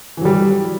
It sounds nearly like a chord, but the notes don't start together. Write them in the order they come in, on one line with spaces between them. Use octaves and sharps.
E3 F#3 G3